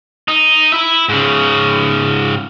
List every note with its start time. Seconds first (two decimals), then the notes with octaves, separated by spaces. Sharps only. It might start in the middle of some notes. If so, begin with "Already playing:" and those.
0.28 D#4
0.72 E4 E5
1.09 G#2 C#3